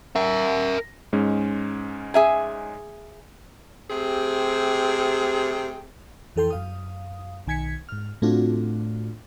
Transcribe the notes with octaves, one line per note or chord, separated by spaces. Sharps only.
A#4 E5
G#2 G#3 C#4
G#4 E5 G#5
C3 A3 C4 G4 G#4
F2 E3 A4 G5 C6
F#2 F5 D#6
B1 D#3 G#5 G#6 B6 C#7
G#2 F6
A2 A3 C4 D4 F4 F#4